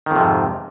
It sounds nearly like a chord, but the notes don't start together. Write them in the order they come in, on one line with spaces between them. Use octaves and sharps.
D#3 F2 C3 G#2